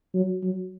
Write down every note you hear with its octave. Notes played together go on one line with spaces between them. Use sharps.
F#3
F#3